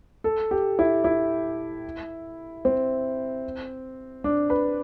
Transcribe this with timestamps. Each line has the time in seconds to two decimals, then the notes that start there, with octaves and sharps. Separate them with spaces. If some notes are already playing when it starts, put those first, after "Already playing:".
0.24 A4
0.51 G4
0.79 E4
1.04 E4
2.65 C4
4.24 D4
4.50 B4